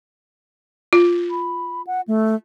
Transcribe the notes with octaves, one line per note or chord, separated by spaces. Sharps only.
F4
B5
F#5
A3